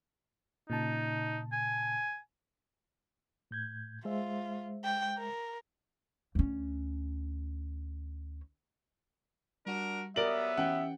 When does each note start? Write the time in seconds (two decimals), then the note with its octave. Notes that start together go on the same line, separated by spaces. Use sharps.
0.70 A#2 C#3 D#4 A5
1.52 G#5
3.51 A2 G6 G#6
4.05 G#3 F4 C5 E5
4.85 G5
5.18 A#4
6.35 D2 C#4
9.66 G3 D4 F#4 A#4
10.16 F#3 B3 G4 A#4 D5 E5 D#6 F#7
10.57 E3 C#4 G4 F#5 G5